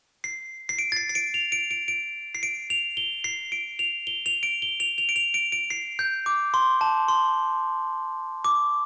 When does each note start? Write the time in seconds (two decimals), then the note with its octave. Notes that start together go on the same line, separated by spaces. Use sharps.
0.24 C7
0.69 C7
0.79 D7
0.92 A6
0.96 C7
1.09 C7
1.15 D7
1.34 F7
1.52 D7
1.71 D7
1.88 D7
2.35 C7
2.43 D7
2.70 F7
2.97 G7
3.24 C7
3.52 D7
3.79 F7
4.07 G7
4.26 F7
4.43 D7
4.62 G7
4.80 F7
4.98 F7
5.09 D7
5.16 F7
5.34 D7
5.52 D7
5.70 C7
5.99 G6
6.26 D6
6.54 C6
6.81 A5
7.08 C6
8.45 D6